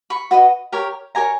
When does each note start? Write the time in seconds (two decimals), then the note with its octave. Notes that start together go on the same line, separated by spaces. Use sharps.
0.10 B5 C#6
0.31 F#4 B4 D#5
0.72 G4 A#4 C#5
1.15 G4 A#4 C#5 G#5 A#5